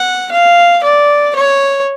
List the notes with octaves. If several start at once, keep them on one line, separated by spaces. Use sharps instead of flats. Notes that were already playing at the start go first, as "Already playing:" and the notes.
Already playing: F#5
F5
D5
C#5